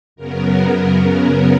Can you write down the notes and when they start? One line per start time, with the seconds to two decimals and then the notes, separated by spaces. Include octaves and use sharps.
0.16 F#2 C#3 F#3 B3 A#4